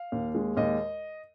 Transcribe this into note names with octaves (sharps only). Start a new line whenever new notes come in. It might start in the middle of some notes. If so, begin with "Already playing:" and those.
Already playing: F5
D#2
G#3
D#2 D#5